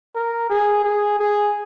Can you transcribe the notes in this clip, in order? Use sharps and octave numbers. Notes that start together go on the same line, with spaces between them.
A#4
G#4
G#4
G#4